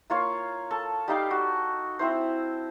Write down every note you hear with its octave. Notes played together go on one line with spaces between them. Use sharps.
A#3 F4 C#5 F5
A4 A5 C#6
G3 D#4 F5 G5
F#4
C4 E4 C5